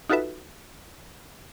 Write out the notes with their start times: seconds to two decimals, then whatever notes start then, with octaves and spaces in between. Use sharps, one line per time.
0.09 D#4 F4 F#4 A4 B4 E5